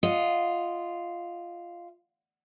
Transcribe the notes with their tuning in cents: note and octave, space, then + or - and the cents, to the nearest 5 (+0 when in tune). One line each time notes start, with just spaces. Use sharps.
F4 -5 D#5 -5 F#5 +0